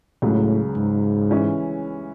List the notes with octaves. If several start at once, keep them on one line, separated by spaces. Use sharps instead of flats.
C#2 A2 C#3 F#3
G#2
E3 G#3 C#4 E4